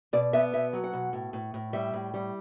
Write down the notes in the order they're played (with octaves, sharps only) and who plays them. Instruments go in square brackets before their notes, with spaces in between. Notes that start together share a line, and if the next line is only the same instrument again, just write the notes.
[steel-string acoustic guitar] B2 D5
B3 E5
B2 E5
F#3
F#5
B2
A2
A2
A2
G3 E5
A2
G3